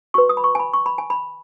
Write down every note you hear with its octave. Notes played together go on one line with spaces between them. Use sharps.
F#4 B4 C#6
D#6
B5
C#6
G#5
B5
C#6
B5
G#5
B5